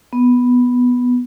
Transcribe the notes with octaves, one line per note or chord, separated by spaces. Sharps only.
B3